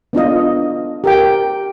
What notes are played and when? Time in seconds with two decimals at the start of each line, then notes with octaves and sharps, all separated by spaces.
0.13 B3 D4 F4 D#5
1.04 G4 A#4 G5